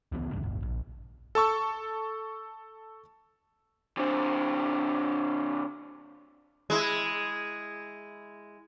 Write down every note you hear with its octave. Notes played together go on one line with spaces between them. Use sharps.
C#2 E3 A#3 B3
D1 C#2 G2
D1 G1
A#1
A4 A5 C#6 E6
D3 C4
G#3 E4